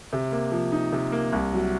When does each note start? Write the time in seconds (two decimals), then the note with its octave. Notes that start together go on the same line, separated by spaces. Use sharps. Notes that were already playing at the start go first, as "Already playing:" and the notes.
0.13 C3
0.32 A#3
0.52 F3
0.72 D#4
0.93 C3
1.12 A#3
1.33 C2
1.53 F#3